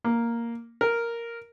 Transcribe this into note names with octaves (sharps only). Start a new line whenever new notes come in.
A#3
A#4